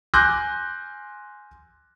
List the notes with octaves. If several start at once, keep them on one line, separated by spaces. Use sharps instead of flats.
G#5 C6 D6 F#6 G6 A#6